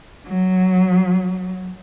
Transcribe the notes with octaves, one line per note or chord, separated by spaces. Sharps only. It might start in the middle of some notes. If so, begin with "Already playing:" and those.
F#3